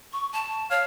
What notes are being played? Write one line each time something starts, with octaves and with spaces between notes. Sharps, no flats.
C#6
A5
C#5 F5